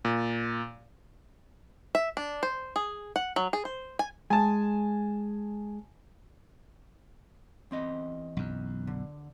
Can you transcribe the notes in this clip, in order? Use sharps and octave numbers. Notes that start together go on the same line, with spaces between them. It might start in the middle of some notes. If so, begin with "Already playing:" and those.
A#2
E5
D4
C5
G#4
F#5
F#3
G#4
C5
G#5
G#3 G#5 A5
E2 C4 D#5
B1 F#2
D3